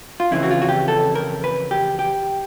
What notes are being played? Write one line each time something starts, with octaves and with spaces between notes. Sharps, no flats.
F4
F2 C#3 E3 E4
F#4
F4
F#4
G4
A4
A#4
B4
G4
G4